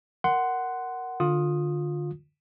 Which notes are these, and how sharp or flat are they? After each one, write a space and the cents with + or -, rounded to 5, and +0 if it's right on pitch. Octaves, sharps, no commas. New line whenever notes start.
A#4 +0 F#5 +10 C6 -15
D3 +20 F4 +20 D#6 +0